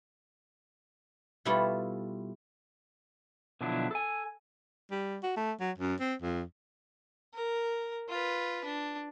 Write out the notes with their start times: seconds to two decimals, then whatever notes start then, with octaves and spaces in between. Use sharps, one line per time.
1.45 B2 G3 A3 E4 F4
3.61 B2 D3 F3 F#3 D4 E4
3.91 A4 G#5
4.91 G3
5.23 F#4
5.36 A3
5.60 F#3
5.78 F#2
6.00 C4
6.22 F2
7.34 A#4
8.09 F4 B4
8.65 D4